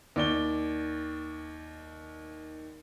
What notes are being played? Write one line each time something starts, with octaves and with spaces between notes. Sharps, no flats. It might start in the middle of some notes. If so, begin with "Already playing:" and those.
D#2 D5 G7